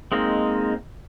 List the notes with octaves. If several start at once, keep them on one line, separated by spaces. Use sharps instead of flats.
G#3 A#3 C4 D#4